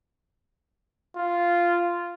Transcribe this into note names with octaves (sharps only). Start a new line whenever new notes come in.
F4